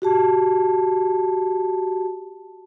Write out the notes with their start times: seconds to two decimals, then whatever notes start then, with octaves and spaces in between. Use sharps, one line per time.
0.02 F#4 G4 A5